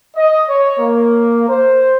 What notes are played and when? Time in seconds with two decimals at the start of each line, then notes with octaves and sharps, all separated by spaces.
0.16 D#5
0.49 C#5
0.78 A#3
1.48 C5